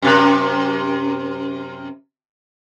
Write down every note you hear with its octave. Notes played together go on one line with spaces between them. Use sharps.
F#2 C3